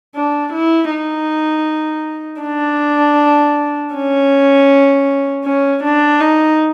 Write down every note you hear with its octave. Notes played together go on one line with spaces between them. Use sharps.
D4
E4
D#4
D4
C#4
C#4
D4
D#4